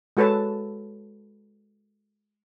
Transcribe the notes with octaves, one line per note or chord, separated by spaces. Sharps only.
G#3 F#4 A4 B4 C#5 A5